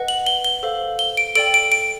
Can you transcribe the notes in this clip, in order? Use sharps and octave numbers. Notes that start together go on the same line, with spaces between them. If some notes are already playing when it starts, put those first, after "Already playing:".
Already playing: B4 D#5 F#5
F#7
G7
G7
A4 C5 F5
G7
D7
A4 D5 G5 D7
D7
D7